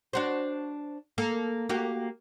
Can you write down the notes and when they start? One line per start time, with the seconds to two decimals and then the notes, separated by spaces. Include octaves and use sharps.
0.13 D4 F#4 C5
1.18 A#3 A4
1.69 A#3 F#4 G4